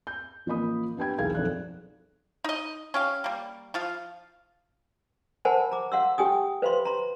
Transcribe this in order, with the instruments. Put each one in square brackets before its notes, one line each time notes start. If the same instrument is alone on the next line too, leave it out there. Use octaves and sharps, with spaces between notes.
[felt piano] G6
A1 F3 A#3 D#5 B5 D#6
B3 D4 G4 G5 B5 G#6
E1 B1 E4 G#4 F5 G#6
B1 F2 A4 D5 F#6
[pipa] D#4 D#5
C#4 G4 F5
G3 A#3
F3 F4 F5
[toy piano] A#4 C5 F#5 G#5 A5 B5
A#5 D6
F5 F#5 C6 E6
G4 G5 G#5 D#6
B4 C5 F5 B5 C6
A#5 C6